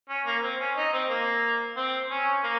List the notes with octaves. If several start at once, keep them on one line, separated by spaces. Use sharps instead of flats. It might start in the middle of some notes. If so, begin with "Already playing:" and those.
C#4
A#3
C4
C#4
D#4
C4
A#3
C4
C#4
A#3